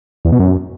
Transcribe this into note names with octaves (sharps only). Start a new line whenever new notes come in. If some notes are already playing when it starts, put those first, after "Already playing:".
E2
B2
F#2